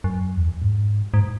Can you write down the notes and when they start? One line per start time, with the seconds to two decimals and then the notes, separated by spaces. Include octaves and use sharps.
0.04 F#2
0.37 E2
0.49 F#2
0.62 G#2
1.14 G#2